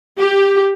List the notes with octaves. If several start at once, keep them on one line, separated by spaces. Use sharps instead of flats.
G4